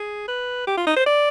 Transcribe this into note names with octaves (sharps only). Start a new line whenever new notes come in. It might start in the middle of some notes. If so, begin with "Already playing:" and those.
Already playing: G#4
B4
G4
F4
D#4
C5
D5